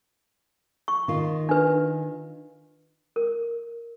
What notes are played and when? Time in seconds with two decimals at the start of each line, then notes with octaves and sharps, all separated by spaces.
0.88 C#6
1.08 D#3 F4
1.49 D4 B4
3.16 A#4